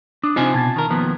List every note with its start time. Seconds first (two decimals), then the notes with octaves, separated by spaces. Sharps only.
0.23 D4 D#6
0.36 C3 C4 D#4 F4 C5 G#5
0.54 B2 A5 G#6 A6
0.76 D#3 A#4
0.90 D#2 F3 B3